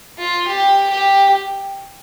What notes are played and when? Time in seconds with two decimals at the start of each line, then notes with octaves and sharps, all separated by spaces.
0.18 F4
0.47 G4
0.90 G4